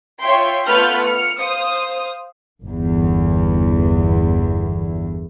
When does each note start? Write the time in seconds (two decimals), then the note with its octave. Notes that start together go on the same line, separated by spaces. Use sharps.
0.21 F4 C#5 E5 G5 C6
0.68 A3 B3 F4 B4 F6 G6
1.06 F6 C#7
1.39 C5 F5 D#6
2.64 G1 E2